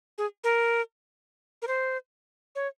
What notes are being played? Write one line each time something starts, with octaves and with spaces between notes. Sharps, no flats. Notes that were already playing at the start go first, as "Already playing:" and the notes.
G#4
A#4
A#4
C5
C#5